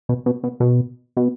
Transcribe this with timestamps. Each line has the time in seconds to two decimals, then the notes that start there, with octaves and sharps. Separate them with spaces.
0.09 B2
0.26 B2
0.43 B2
0.60 B2
1.17 B2